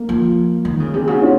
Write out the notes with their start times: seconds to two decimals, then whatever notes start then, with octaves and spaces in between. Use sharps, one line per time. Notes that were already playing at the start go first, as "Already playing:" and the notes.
Already playing: A#3
0.09 F3
0.65 D#3
0.80 C#3
0.94 C3 G#4
1.07 C#3 F#4
1.22 C#4 F4